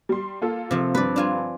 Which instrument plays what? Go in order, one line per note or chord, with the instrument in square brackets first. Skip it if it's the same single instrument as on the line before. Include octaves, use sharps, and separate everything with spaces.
[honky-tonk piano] G3 C6
A#3 F4 A4
[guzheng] C3 F3
[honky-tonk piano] G2 D3 [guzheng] B4 D5
[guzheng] D4 F4 G#5